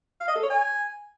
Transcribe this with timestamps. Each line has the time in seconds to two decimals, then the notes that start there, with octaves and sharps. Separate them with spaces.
0.20 F5
0.28 D#5
0.35 A4
0.43 C#5
0.50 G#5